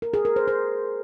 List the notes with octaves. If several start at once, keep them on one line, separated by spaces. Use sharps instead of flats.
A#4
G#4
A#4
C5
C5